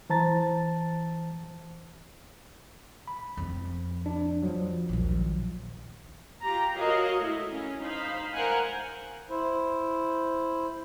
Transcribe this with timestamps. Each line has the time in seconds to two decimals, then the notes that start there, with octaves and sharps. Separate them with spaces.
0.10 E3 C5 A5 A#5 A6
3.08 B5
3.37 F2
4.06 D4
4.43 F3 F#3
4.89 A#1 D#2
6.41 F4 G4 A#5
6.77 F#4 A#4 C#5 D#5 F5
7.19 A3 E4
7.50 C#4
7.81 D#4 C5 F5 B5
8.33 A#4 C5 F5 F#5 G#5
9.30 E4 C5